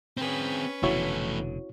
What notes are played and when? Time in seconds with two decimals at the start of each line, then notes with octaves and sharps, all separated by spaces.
0.17 C4 C#4 G#4 B4
0.83 F1 B2 D3 E3 A3 E4 F#4 C#5